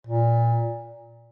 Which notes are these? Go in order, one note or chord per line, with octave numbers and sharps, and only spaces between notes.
A#2